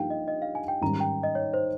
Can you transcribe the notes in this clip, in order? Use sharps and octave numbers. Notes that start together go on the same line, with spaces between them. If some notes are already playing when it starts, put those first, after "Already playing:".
Already playing: G2 F3 A#3 D#4 G4 F5 G5
D#5
D#5
F5
G#5
G5
G#2 D#3 G3 C#4 A#5
G5
D#5
C#5
C5